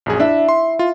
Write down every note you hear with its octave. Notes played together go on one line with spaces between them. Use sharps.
A#1 F#2 G#4
D4 E4 E5
C6
F4